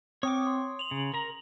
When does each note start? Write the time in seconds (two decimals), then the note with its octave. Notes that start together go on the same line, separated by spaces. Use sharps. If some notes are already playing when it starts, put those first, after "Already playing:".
0.23 C4 C#5 G5 D6 D#6
0.47 C6
0.79 F7 F#7
0.91 C#3
1.14 A#4 A#5